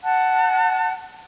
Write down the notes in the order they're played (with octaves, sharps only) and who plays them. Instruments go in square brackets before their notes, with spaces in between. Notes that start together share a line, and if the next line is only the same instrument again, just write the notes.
[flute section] F#5 A5 F#6